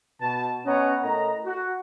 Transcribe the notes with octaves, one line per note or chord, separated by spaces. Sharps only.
B2 A5
B3 C#4 C#5 D#5 F#5 A#5
A2 A#4 D#5 A#5
F#4